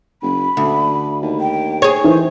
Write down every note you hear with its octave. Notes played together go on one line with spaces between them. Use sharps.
F#1 B5
D2 D3
D#2
G5
G#4 C#5
D#3 E3 C5